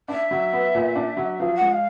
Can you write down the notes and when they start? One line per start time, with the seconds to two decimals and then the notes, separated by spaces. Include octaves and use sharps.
0.08 D4 E5
0.31 F#3
0.53 B3
0.75 A#2
0.95 D4
1.17 F#3
1.40 F3 F5
1.55 F#5
1.61 G#3
1.72 F5